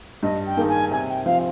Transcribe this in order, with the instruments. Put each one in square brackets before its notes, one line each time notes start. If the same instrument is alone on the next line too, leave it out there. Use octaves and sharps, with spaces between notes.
[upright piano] G2 [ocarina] D#5
[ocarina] G5
[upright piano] D#3 A#3 D#4 G#4
[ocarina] G#5
[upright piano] C3 [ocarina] G#5
[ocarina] G5
[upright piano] F3 C4 [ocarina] F5